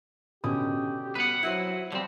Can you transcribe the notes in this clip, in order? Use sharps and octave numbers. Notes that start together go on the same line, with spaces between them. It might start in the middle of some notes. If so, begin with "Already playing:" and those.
B2 D3 C#4 G4 D#6
G3 B3 B4 F#5
F#3 E4 F#4 C5
D3 F3 G3 C4